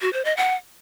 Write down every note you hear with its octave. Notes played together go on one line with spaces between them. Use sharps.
F#4
C5
D#5
F#5